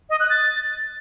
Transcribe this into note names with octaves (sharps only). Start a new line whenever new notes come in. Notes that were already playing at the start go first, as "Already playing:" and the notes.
D#5
F#6
A6